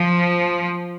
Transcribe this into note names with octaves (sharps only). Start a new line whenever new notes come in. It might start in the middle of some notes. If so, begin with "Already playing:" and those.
Already playing: F3